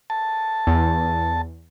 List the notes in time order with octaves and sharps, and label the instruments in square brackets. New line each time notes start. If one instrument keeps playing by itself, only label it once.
[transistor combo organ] A5
[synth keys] E2